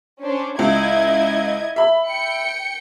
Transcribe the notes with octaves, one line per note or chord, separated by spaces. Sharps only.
C#4 D4 C5
C#2 E4 D#5 G#6
E5 B5
G5 C#7